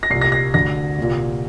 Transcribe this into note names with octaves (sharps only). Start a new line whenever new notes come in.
A#6
C2 A#2 C7
A#6
A#6
D2 D3 A#6
C2 A#2